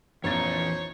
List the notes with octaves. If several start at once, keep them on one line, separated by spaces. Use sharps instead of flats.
A#1 F2 E3 D#4 C5 C#5 A#5 A6